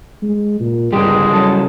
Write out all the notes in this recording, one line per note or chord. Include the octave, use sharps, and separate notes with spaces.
G#3
A#2
G1 C#3 G3 G#3 G4
F#3 C#4 A4